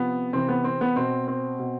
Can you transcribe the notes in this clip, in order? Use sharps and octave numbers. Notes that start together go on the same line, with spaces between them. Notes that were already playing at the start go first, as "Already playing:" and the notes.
Already playing: C3 F3 B3
C3 E3 C4
B3
C4
B3
B2 C4
C4
B2